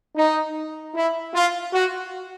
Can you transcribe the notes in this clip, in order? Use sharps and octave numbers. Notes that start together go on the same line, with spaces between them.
D#4
E4
F4
F#4